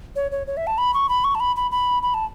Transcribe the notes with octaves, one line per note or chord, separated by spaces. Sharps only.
C#5
C#5
C#5
E5
A5
B5
C#6
B5
C#6
A5
B5
B5
B5
B5
A5